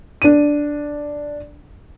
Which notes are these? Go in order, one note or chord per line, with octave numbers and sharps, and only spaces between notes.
D4 D#7